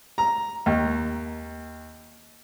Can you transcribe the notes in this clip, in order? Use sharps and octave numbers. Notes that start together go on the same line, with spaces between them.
A#5
D#2